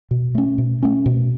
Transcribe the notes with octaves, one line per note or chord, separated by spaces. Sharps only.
B2
A3 C#4
B2
A3 C#4
B2